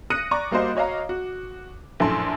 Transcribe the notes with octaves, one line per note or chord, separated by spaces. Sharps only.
D#6 F#6 A#6 C#7 D#7
D5 A#5 C#6 D6
G3 A#3 F#4 C5 D#5
F#4 C#5 D#5 F5 A#5
F#4
A#1 F#2 A2 A4 A5 C6